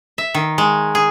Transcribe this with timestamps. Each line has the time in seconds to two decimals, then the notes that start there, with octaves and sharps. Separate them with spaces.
0.18 E5
0.34 D#3
0.58 G#3
0.95 G#4